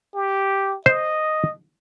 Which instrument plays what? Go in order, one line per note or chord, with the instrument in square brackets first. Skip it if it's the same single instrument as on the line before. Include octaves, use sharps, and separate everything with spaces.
[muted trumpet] G4
[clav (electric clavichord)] C5 [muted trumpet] D#5